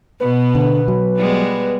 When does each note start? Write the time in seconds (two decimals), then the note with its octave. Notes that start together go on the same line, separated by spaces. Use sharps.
0.20 B2 B3 B4
0.55 D3
0.88 F#3
1.17 G3 G#3 B3